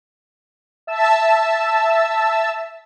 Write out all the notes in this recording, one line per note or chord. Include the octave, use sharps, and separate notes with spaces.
E5 A5 E6